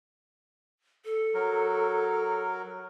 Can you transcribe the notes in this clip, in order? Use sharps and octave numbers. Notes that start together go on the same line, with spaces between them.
A4
F#3 A#4